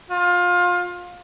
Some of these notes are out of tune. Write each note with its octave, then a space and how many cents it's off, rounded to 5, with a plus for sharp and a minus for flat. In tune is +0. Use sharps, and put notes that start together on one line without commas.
F4 +25